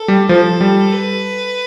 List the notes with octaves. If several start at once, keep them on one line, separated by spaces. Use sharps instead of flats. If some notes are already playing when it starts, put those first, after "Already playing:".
Already playing: A4
G3
F3 A4
G3
B4